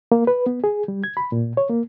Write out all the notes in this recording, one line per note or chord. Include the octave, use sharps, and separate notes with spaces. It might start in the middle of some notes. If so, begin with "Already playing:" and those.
A#3
B4
B3
G#4
G3
G#6
B5
A#2
C#5
A#3